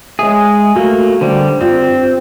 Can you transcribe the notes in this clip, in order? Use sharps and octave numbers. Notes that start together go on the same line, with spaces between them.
G#3 G#4 C#5 D#5 E5
A3 A#3 F#4
D3 G3 C5
G2 C4 F4 D5